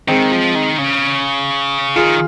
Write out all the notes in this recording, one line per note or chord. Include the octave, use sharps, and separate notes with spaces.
D#3 G#3 C4
F3
D#3
C#3
D#3 F4 G#4